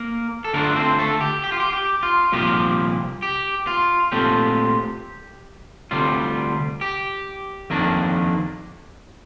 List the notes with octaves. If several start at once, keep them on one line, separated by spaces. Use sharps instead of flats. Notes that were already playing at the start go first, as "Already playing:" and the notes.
Already playing: A#3 A#4
A4
D3 A3 A#3 D4 F4 A#4
C4 C5
A3 A4
G4
G4
F4
G4
G4
F4
C2 A#2 F3 A#3 G4
G4
F4
A#2 A3 C4 F4 G4
D2 C3 G3 F4
G4
F2 D#3 A#3 D4